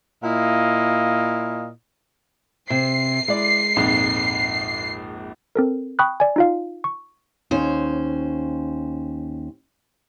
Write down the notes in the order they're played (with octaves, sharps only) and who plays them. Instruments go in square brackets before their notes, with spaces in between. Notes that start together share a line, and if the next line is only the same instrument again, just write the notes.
[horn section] A#2 E4 D#5 F5
[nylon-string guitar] C3 [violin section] C7
[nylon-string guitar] G#3 [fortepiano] E4 D5
[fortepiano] A#1 F2 G#2
[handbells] C4 A4 A#4
G5 B5 C#6 D#6 F#6
D5 G#5
D#4 F4 F5
C#6
[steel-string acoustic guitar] D#2 C#4 C5